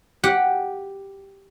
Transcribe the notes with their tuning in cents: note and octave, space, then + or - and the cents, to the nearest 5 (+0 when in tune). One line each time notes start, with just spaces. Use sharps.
G4 +0 F#5 +0